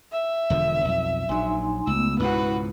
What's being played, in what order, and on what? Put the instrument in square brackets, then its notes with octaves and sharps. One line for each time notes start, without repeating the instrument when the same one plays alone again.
[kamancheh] E5
[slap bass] E1 D3 F3
B1 F2
[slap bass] A#1 F#3 [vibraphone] D#4 G#5 C6
[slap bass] C#2 [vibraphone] A3 B3 [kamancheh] E6
[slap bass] C#2 G#2 B2 [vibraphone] E4 [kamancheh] F#4 B4